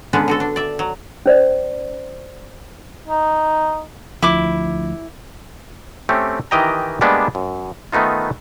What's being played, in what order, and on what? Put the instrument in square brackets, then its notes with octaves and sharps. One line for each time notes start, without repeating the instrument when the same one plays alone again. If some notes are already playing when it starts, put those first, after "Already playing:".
[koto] D3 G#3 B3 C#4 D4 B4
D3 F#4 A4
D4
D5 E5
F#3
[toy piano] C#4 C5 D5
[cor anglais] D#4
[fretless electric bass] D2 F3 [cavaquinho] E4 D6
[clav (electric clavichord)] A3 C4 C#4 G4
D#3 E3 G4 D#5 G5 A#5
G3 G#3 A#3 B3 D4
F#2
D#3 A3 B3 D#4 F4